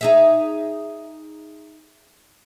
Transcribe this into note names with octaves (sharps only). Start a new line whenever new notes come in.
D#4 G#4 E5